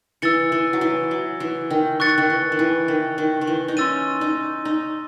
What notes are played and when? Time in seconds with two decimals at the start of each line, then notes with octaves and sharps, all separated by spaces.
0.22 E3 E6 A6 C#7
0.52 E3
0.73 F#3
0.81 E3
1.11 F#3
1.40 E3
1.70 D#3
2.00 D#3 C#6 F#6 A6 C#7
2.18 D#3
2.30 E3
2.52 D#3
2.59 E3
2.88 D#3
3.18 D#3
3.41 D#3
3.47 E3
3.68 D#4
3.77 C#4 C6 E6 A6 D#7
4.21 D#4
4.65 D#4